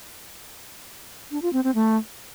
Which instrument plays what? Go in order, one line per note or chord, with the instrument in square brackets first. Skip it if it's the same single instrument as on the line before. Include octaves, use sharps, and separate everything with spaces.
[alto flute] D4
F4
C4
C4
A3